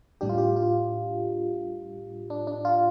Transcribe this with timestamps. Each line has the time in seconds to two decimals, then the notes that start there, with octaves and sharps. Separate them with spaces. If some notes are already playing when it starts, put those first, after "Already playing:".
0.21 A2 G3 D4 G4
0.29 F4
0.38 G4
0.56 F4
2.30 D4
2.47 D4
2.65 F4